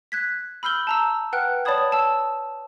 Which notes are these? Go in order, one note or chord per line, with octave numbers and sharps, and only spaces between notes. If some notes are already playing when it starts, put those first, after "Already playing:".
F#6 G#6 B6
B5 E6 F6 G6 G7
A5 A#5 E6
B4 F#5 G5 F6 F#6
C#5 D5 A5 B5 D#6 G#6
A5 E6